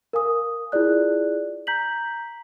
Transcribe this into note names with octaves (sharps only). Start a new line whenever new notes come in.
A#4 F5 G#5 D#6
E4 F4 G#4 D5 F#6
A#5 G6 B6 F#7